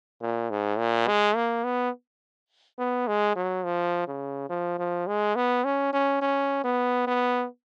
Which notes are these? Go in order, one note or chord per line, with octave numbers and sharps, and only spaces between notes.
A#2
G#2
A#2
G#3
A#3
B3
B3
G#3
F#3
F3
C#3
F3
F3
G#3
B3
C#4
C#4
C#4
B3
B3